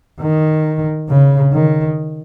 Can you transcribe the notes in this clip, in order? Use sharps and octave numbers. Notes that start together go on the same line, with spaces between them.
D#3
C#3
D#3